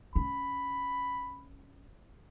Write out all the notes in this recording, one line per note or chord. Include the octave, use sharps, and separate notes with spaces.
C#4 B5